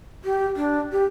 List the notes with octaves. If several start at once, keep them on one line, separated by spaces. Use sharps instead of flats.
G4
D4
G4